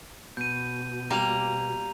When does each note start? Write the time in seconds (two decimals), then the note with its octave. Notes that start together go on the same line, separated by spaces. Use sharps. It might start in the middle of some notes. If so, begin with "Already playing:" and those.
0.37 B2 G6 D#7
1.10 G3 A#3 A#5 F7